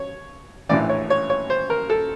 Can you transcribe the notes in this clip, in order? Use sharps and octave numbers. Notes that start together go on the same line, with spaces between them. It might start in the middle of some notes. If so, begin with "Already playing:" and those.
Already playing: C#5
A#1 A2 E3 D5
C#5
C#5
C#5
C5
A#4
A4